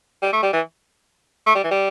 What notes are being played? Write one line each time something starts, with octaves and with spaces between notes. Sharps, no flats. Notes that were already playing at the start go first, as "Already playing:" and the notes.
G3
A3
G3
E3
A3
G3
E3
G3